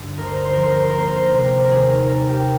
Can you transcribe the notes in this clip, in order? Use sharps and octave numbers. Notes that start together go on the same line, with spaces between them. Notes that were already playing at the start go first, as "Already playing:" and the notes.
Already playing: G2 D3
D2 A#4
C5
A#4
C5
F3 A#4
C5
A#4
C5
A#4
A#3 C5
A#4
C5
A#4
C3 C5
A#4
A#4
D#2 G#4
A#4
G3 A#4
G4